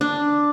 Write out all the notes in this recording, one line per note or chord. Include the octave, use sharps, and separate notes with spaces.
D4